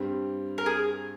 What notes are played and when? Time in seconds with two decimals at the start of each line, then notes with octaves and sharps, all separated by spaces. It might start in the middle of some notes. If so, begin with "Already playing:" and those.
Already playing: G2 G3 C4
0.58 A#4
0.66 G#4